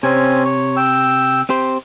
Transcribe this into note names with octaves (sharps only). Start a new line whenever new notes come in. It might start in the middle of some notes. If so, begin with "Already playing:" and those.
C3 C4 C#4 G#5
C#5
G5 E6
C4 G4 C5